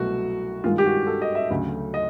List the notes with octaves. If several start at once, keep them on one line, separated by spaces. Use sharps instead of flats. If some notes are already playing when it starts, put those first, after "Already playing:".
Already playing: C2 B2 F#3 A3 F#4
G2 D#3 G#3 F4
G4
F#4
A4
D#5
E5
D2 C#3 F#3 A3
D#5